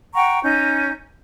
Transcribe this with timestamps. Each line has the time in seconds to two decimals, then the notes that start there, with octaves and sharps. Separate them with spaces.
0.14 F#5 G5 A#5 C#6
0.44 C#4 D#4 G6